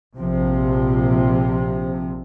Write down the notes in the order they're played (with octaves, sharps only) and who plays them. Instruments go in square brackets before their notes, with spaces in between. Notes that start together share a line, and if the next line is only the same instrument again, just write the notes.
[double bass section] A#1 C3 F3